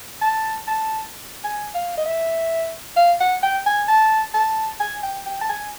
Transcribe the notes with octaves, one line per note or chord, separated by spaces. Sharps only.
A5
A5
G#5
F5
D#5
E5
F5
F#5
G5
G#5
A5
A5
G#5
G5
G5
A5
G#5